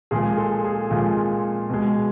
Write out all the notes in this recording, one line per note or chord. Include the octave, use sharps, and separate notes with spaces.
A#2 F3 G#3 G#4
A4
G#4
A#2 F3 G#3
B2 G#3